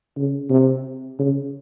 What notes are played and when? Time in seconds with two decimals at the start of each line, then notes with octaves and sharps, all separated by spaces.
0.17 C#3
0.50 C3
1.19 C#3